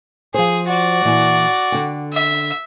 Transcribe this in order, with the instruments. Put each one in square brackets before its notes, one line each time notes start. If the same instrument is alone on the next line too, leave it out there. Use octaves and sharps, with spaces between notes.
[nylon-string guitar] F3 C5 [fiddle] G#4
[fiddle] F#4 D5
[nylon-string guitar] A#2 E3
D3 G5
[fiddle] E5